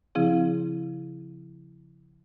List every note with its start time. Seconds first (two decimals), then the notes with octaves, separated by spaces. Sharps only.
0.15 C#3 F3 C4 E4 G#4